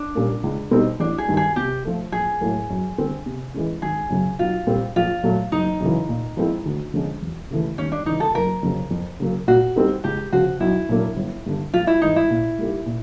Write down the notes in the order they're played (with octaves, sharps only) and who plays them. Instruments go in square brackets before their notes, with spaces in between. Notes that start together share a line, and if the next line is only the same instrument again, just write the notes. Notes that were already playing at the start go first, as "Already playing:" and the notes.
Already playing: [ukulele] D4
[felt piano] A#2 G3 A#3 C#4
C#2
B2 G3 C4 D#4
[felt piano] A1 [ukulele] D4
[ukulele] G#4
[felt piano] G2 D#3
[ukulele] G#4
[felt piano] C3 [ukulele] G4
[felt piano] F3 A3
[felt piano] A#1 [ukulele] G#4
[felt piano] A2 F#3 A#3
F#2
D3 G3 C4
C3
E3 G#3 C#4
[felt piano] G#1 [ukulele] G#4
[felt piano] F#2 C#3 F#3
[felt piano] B1 [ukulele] F4
[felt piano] A#2 G3 C4
[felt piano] A#1 [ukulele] F4
[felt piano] A#2 F#3 A3
[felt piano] F#1 [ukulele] D#4
[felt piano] F#2 C#3 E3
A#2
F3 G#3 C4 E4
D2
D3 F3 G#3 C#4
E1
D#2 C#3 E3 A3
[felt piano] D#2 [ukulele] C#4
[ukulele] D4
[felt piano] C#3 E3 [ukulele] D#4
[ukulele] A4
[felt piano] F#1 [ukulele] A#4
[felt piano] F2 C#3 F#3
F2
C#3 F#3 A#3
[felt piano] A#2 [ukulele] F#4
[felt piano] G3 C4 D#4 G4
[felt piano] C#2 [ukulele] G4
[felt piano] C#3 F3 [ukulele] F#4
[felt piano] B1 [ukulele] E4
[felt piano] A#2 F#3 A#3 D4
G1
G2 D3
[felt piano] A#1 [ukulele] F4
[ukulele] E4
[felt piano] G#2 E3 [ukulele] D#4
[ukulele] E4
[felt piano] A#2
G3 A#3 D#4 G4
A#2